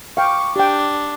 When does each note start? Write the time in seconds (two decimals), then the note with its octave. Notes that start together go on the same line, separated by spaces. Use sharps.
0.17 F5 G5 C#6 D6
0.56 D4 G4 G5